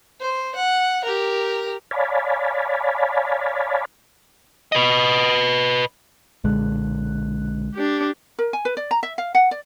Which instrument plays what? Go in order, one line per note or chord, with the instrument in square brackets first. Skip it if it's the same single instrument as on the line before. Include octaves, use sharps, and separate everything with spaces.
[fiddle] C5
F#5
G4 A#4
[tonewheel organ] C#5 D5 F5 G#5 A5 B5
[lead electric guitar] B4 D#5
[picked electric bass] B1 A#2 D3 [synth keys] G#3 F#6
[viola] D4 G4
[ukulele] A#4
G#5
B4
D5
A#5
E5
F5
F#5
D5